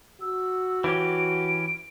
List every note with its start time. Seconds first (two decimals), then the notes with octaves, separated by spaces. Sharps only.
0.21 F#4 E6
0.84 E3 C#4 G4 D7